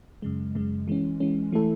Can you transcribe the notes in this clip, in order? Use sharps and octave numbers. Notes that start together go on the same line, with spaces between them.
F#2 C#3 G#3
F#2 C#3 G#3
E3 G#3 C#4
E3 G#3 C#4
E3 A3 E4 A4